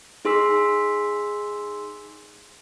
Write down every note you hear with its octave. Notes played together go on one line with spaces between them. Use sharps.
D#4 G#4 C6 E6 B6